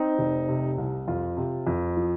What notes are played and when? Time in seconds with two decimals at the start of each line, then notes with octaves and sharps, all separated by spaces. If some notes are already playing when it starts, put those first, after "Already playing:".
Already playing: C4 D#4
0.19 F1
0.48 C3
0.78 C2
1.08 F2 F4
1.37 C3
1.67 F2
1.97 F3